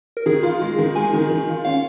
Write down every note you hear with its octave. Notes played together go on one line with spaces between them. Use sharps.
A#4
D#3 G#4
F4
G#3
D#3
G#3 G#5
D#3
D#3
F4
C#4 F5